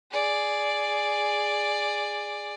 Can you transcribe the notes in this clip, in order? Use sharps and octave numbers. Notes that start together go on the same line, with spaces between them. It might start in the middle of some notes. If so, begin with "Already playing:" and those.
G#4 D5